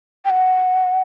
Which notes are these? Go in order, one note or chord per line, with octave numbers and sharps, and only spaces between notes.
G5
F#5